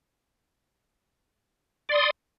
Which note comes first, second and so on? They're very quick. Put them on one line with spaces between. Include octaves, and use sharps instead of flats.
D5 C6 D#6